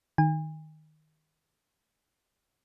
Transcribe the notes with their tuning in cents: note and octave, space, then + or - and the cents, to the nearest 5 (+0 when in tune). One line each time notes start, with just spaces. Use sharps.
D#3 -5 G#5 -40